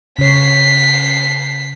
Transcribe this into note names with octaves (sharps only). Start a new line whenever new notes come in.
C#3 C#5 B6 C7